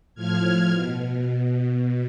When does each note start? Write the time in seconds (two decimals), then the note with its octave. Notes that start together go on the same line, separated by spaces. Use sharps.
0.15 A2 F3 F6 G#6
0.70 B2